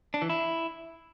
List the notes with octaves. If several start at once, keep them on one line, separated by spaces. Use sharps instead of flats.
D4
E3
E4